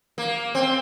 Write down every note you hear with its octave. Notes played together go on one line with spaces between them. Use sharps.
A#3
C4